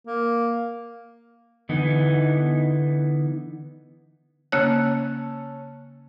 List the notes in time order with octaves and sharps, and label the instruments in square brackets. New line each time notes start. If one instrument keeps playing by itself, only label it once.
[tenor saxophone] A#3
[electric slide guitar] D3 E3 B3 D#4
[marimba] C#3 A#3 F#6 [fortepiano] C#4 A5 E6